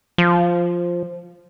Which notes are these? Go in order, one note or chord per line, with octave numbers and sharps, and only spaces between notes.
F3